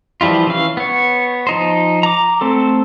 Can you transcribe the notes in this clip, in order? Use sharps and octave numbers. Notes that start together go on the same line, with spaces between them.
E3 F3 G3 E4 F4
E3 C#4 F5
B3 C#5
F3 D#4 C5
A#5 D6
A3 C4 A4